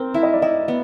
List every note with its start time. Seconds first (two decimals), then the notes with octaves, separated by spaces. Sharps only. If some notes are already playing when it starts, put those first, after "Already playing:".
Already playing: C4 A#4
0.14 E4 E5
0.23 D#5
0.33 D5
0.42 E4 D#5
0.68 B3